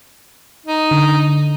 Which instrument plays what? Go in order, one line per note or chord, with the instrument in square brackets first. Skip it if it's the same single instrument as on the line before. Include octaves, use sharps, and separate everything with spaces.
[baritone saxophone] D#4
[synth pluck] D3